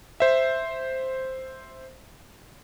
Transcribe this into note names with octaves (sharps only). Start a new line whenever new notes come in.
C5 E5